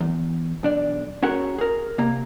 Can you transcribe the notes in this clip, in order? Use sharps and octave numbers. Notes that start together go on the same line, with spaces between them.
E2
B1 D4 D5
C#4 F#4 G#4 A#4 C#5 F#5
G#4 A#4
C3 A#3 A#5